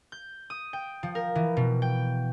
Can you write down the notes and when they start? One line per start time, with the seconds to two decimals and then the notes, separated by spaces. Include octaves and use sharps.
0.12 G6
0.50 D#6
0.73 G5
1.03 F3
1.15 A#4
1.35 E3
1.57 B2
1.82 G5